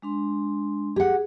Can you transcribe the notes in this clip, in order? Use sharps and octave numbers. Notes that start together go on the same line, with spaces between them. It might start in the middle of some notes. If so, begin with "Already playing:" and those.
G#3 D4 C6
G4 G#4 F#5